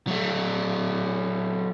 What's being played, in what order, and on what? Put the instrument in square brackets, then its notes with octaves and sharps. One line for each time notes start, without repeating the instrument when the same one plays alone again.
[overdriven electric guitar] F#3 A3